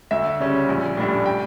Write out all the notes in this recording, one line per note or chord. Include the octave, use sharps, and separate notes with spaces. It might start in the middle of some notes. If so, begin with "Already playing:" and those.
D2 E5
C#3 G3 C#4
A#1
A2 G3 D4
G5